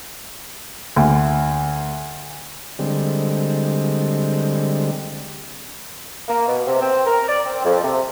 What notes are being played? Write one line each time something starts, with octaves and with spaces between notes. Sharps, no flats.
D2
D3 G3 G#3 C4
A#3
B2
C3
C4
A#4
D5
C4
F2
C3